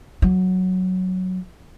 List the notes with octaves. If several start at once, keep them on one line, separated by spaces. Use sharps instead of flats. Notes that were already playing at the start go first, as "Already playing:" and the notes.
F#3